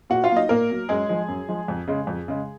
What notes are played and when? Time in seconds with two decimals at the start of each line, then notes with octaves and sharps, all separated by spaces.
0.10 A#2 F#4 F#5
0.24 F4 F5
0.30 F#3 A#3
0.36 D#4 D#5
0.49 A#2 A#3 A#4
0.70 F#3 A#3
0.89 F#2 G#3 G#4
1.09 F3 G#3
1.28 F#2
1.49 F3 G#3
1.68 F2
1.88 C#3 G#3
2.07 F2
2.28 C#3 G#3